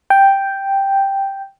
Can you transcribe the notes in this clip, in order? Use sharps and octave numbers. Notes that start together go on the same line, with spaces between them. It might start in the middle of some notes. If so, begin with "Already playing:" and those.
G5